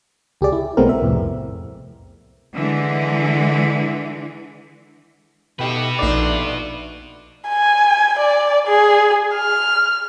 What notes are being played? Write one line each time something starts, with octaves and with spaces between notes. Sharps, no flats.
C#2 G4 G#4 D5
E4
B1 G#3 A3 B3 C4 A#4
E5
C2 F2 A2
D3 E3 G#3
B2 A3 D#4 F#4 G4 B4 G5
A#1 A3 D4 D#4 F4 D5 D#5
G#5
D5
G#4
F6